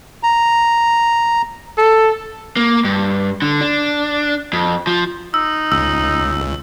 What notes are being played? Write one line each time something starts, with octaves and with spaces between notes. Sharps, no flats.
A#5
A4
A#3
G2
D3
D4
F2
F3
D#4 E6
C#2 E6